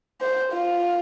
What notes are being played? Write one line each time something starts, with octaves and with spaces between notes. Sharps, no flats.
C5
F4